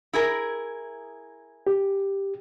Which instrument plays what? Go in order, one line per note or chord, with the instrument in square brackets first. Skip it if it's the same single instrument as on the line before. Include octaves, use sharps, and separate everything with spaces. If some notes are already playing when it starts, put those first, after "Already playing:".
[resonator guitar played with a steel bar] E4 G#4 A#4
[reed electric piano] G4